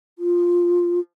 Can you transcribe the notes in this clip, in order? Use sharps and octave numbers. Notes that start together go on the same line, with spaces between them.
F4